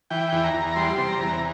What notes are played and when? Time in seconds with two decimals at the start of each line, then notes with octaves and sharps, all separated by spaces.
0.10 E3 G5
0.32 E2
0.44 A#5
0.54 E2
0.76 G3 C6
0.98 C3
1.08 A#5
1.19 E2